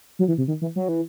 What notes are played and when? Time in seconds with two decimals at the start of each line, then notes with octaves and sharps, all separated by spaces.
0.19 F#3
0.28 E3
0.38 C3
0.48 D#3
0.61 E3
0.76 F#3
0.89 E3